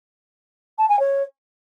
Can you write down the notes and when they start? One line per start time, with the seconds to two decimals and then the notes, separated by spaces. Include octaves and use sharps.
0.78 A5
0.89 G#5
0.99 C#5